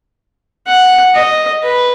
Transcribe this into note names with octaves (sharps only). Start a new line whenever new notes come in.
F#5
D#5
B4